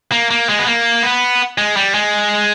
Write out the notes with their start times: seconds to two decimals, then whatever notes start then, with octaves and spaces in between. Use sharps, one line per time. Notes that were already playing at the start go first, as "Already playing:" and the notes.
0.12 A#3
0.31 A#3
0.49 G#3
0.59 B3
0.66 A#3
1.03 B3
1.58 G#3
1.76 G3
1.94 G#3